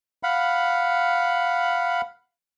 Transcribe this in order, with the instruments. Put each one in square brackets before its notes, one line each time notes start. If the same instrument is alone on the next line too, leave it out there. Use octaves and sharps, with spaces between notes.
[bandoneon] F5 F#5 B5